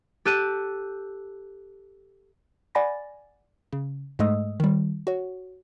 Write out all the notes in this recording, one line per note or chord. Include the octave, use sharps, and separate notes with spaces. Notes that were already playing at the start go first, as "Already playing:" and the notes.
G4 A4 F#6 D#7
D5 F#5 G#5 B5 A6 A#6
C#3
G#2 G#3 A3 D#5 D#6 E6
D#3 G3
F#4 C#5